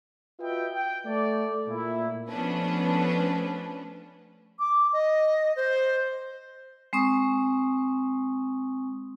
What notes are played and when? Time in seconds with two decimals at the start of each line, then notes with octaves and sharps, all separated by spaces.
0.39 F4 F#4 B4 D#5 E5 G5
0.73 G5
1.05 A3 D5
1.68 A#2 E4
2.29 F3 A3 B3 C#4 D4 B4
4.59 D6
4.93 D#5
5.56 C5
6.93 G#3 C4 C#6 D#6